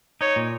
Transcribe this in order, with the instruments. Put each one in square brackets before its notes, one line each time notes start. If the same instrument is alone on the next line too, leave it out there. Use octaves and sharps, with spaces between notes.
[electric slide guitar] D#4 [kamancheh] C#5
[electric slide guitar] A#2